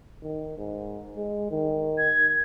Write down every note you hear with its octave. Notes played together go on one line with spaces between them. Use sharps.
D#3
G#2
G#3
D#3
G#6